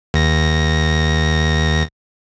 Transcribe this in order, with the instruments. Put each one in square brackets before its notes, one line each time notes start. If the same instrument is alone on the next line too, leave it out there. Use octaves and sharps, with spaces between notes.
[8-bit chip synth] D#2 A#6